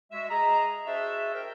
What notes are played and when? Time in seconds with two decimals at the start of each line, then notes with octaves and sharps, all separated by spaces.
0.12 G#3 F#4 E5
0.30 G#4 D#5 A#5
0.86 D4 F#4 G#4 C5 D#5 E5
1.34 A#4 G5